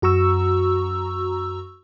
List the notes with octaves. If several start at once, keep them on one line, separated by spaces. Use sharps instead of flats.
F#2 F#4 A#5 C#6 E6